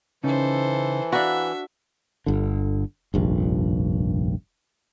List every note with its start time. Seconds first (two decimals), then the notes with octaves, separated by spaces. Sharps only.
0.24 C#3 E3 C#4 D#4 A4 C5
1.12 D4 F#4 E5 F5 A#5 B5
2.26 G1 D3
3.14 F1 A#1 G2